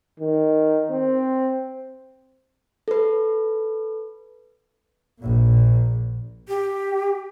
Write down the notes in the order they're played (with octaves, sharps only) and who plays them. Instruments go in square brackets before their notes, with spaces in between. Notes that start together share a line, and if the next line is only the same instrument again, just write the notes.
[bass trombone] D#3
C4
[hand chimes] A4 B4
[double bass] A#1 A#2
[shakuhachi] G4